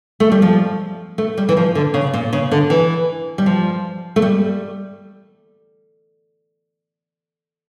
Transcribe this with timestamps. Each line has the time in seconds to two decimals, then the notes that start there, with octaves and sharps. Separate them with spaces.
0.20 A3
0.32 G3
0.42 F3
1.18 A3
1.37 G3
1.49 E3
1.57 F3
1.75 D3
1.94 C#3
2.13 A#2
2.33 C#3
2.51 D3
2.70 E3
3.38 G3
3.46 F3
4.16 A3
4.22 G3